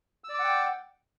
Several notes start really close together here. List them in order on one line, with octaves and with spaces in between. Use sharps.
E6 D5 D6 F#5 G5